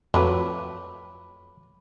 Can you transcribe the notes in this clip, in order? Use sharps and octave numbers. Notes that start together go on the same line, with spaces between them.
F2 F#3 A3 F4 B4 B5 D6